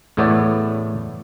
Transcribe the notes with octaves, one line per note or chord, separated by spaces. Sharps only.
E2 A2 A3 B3 C#5 D5